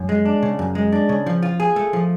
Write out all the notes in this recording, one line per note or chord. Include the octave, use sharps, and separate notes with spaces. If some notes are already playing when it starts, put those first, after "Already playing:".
Already playing: F#2
G#3
D4
C#3
F#2
G#3
D4
C#3
F3
F4
G#4
A3
F3